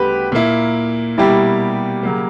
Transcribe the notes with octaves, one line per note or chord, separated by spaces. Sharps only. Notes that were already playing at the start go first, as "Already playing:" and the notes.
Already playing: D2 C#3 G3 B3 F#4 G4 B4
A#2 A#3 E4
B2 G3 A#3 E4 G4
C#3 F#3 A#3